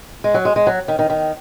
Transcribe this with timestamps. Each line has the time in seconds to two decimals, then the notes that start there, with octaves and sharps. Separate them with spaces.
0.24 G#3
0.34 F#3
0.45 G#3
0.56 G#3
0.67 F#3
0.88 D#3
0.99 D#3
1.10 D#3